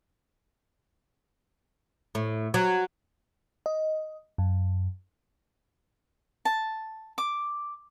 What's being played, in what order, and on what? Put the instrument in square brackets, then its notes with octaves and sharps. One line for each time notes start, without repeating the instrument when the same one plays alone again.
[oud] A2
F#3
[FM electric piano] D#5
F#2
[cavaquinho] A5
D6